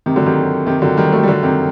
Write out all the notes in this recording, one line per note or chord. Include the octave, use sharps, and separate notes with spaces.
C3 D#3
D3 F#3
C3 D#3
C3 D#3
D3 F#3
D#3 G3
F#3 A3
G3
D3 F#3
C3 D#3